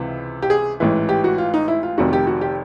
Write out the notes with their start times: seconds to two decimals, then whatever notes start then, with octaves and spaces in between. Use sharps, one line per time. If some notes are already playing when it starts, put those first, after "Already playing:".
Already playing: C#2 C3 E3
0.43 G4
0.50 G#4
0.80 A1 G#2 E3
1.09 G4
1.24 F#4
1.38 F4
1.54 D#4
1.68 E4
1.83 F4
1.98 F1 F2 C3 D#3 F#4
2.13 G4
2.27 F#4
2.41 G4